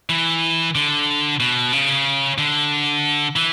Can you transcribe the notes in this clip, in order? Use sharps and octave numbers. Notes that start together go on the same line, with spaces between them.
E3
D3
B2
C#3
D3
E3